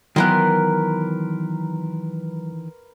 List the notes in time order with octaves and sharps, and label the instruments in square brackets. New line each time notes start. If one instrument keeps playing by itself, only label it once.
[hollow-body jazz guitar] D#3 E3 B3 [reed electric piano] F#3 F#6 [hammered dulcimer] A#4 B4 C6